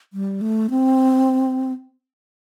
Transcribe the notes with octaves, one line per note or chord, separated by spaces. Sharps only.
G3
A3
C4